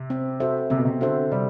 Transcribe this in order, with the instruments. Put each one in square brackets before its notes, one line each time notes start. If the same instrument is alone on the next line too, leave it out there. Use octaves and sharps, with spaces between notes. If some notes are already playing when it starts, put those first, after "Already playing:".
Already playing: [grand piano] C3
[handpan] C4
F#4 A4 C5 E5
[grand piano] C3 [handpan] C4
[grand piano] B2
C3
[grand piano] D3 [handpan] F#4 A4 C5 E5
[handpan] C3 [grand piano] G3